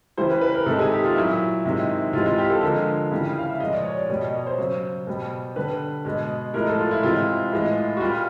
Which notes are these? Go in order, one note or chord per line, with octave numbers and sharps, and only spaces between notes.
C#3 E3 G3 C5
B4
B4
A#4
C3 D#3 G#3 A4
G#4
G4
F4
A#2 F#3 E4
C3 D#3 G#3
C3 E3 G#3 F4
F4
G4
A4
D3 F3 G#3 A#4
C#3 E3 G3
F5
E5
A#2 F3 G#3 D#5
D5
C#5
D5
B2 G3 D5
D#5
C#5
C5
C#3 F#3 C5
B2 G3
D3 G3 B4
B2 G#3
A2 F3 G#3 A#4
A4
F4
E4
C3 E3 G#3 F4
A2 E3 G#3
F#4
A#2 G3 F4